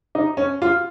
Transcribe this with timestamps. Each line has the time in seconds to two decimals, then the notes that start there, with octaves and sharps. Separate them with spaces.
0.15 D#4
0.37 C#4
0.62 F4